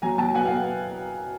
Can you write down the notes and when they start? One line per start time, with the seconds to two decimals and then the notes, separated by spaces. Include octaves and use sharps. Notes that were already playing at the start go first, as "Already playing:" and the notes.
0.02 F#3 G#5 A#5
0.18 F#3 G5 A5
0.34 B3 F#5 G#5
0.45 F5 G5
0.50 B3